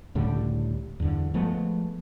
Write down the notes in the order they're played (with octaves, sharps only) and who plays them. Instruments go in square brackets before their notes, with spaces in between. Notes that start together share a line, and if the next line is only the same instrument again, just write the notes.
[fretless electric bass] C#2 A2 D3 G3
E2 G2 D3
F3 G#3 A3 B3